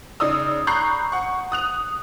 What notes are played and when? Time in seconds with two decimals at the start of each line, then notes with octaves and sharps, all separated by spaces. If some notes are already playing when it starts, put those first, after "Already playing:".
0.20 C#3 D#4 D5 D#6 E6
0.67 A#5 B5 C#6 F#6 G6 C7
1.12 F#5 C#6
1.52 D#6 F#6 F7